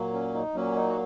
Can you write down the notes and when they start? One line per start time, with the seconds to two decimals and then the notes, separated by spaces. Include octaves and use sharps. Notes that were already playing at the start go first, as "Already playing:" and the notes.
Already playing: A#2 F#3 A#3
0.14 C#4
0.34 D#4
0.55 A#2 F#3 A#3 C#4
0.76 D#4
0.89 F#4